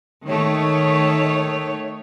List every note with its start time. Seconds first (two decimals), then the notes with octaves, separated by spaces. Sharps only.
0.25 D#3 A3 C#5